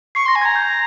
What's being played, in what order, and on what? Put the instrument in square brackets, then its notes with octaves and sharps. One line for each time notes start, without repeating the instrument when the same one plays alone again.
[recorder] C#6 [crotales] C7
[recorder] C6 [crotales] A#6
[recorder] G#5
[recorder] A#5 [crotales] G#6
[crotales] G6